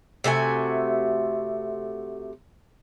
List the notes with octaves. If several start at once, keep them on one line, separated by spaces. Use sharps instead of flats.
C3 A3 F#4 G#5